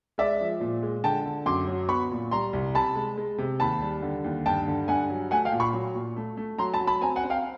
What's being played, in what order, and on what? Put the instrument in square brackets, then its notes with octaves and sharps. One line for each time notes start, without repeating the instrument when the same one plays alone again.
[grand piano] G#3 D5 E5
F3
A#2
G#3
D3 G5 A5
D3
F#2 C6 D6
F#3
B3 B5 C#6
A#2
G3 A#5 C6
C2
C3 A5 B5
G#3
G#3
C3
D#2 A5 B5
G3
D3
D#2
G2 G5 A5
D3
G2 F#5 G#5
F#3
A3 F#5 G#5
F5 G5
A#2
B5 C#6
F#3
A#2
A3
A3
F#3 A#5 C6
A5 B5
F#3
A5 B5
C4 G#5 A#5
F#5 G#5
C4
F5 G5